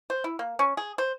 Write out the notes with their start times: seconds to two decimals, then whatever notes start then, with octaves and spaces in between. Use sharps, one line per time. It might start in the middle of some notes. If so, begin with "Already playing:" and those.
0.10 C5
0.24 E4
0.39 A#3
0.59 C#4
0.77 G#4
0.98 C5